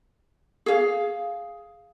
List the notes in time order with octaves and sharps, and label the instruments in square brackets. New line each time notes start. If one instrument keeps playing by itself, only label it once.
[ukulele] G#4 F5